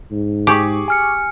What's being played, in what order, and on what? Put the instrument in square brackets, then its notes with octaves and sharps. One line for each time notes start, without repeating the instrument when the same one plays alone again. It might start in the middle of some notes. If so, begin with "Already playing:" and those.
[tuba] G#2
[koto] G4 [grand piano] G#4 C#6 D6
[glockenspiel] G#5 F6 C#7